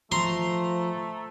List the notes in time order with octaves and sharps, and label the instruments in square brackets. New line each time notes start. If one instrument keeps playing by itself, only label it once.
[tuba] F3 [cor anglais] A3 [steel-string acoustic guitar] A#5 [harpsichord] C6